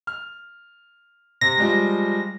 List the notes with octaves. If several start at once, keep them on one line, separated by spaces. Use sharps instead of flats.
F6
C3 A#6
F3 G3 G#3